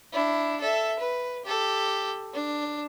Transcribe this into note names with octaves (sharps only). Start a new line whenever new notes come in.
D4 E4
A4 E5
B4
G4 A4
D4